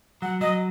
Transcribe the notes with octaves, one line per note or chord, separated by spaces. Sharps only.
F#3 F#5
F#3 D#5